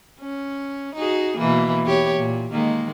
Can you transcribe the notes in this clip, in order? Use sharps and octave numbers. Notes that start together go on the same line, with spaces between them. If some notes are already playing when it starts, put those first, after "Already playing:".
C#4
D#4 F#4 G#4
B2 E3 A#3
E2 G4 C#5
A#2
D#3 G#3 A#3